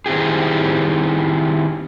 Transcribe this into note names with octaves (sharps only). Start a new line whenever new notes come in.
D#3 C4 E4 G4 G#4